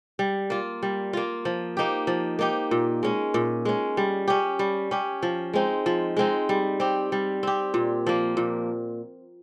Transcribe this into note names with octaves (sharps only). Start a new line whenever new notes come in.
G3
A#3 F4
G3
A#3 F4
F3
A#3 D#4 G4
F3
A#3 D#4 G4
A#2
G#3 C#4
A#2
G#3 C#4
G3
C#4 G4
G3
C#4 G4
F3
G#3 C4 D#4
F3
G#3 C4 D#4
G3
C4 G4
G3
C4 G4
A#2
F3 A#3
A#2